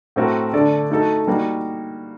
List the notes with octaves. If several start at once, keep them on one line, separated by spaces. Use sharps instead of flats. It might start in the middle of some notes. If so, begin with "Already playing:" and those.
A2 A3 C4 F#4 A#4
D3 A3 D4 A4 D5
A3 D#4 F#4 A4
G3 A#3 D#4 F#4